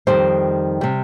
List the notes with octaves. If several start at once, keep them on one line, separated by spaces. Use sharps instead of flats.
F2 D#3 G3 C5
C3 G3